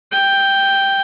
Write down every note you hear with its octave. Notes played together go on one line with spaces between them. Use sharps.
G5